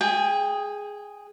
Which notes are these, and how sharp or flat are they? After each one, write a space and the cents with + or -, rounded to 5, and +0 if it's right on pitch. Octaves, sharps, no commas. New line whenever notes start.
G#4 +0 G5 +25